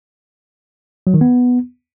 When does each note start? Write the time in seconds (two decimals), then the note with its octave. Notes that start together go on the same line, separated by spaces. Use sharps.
1.07 F#3
1.14 D#3
1.21 B3